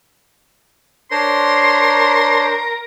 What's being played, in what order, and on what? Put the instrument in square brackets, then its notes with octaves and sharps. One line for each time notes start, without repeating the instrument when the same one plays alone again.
[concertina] D4 C5 C#5 [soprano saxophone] A#4 [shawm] C6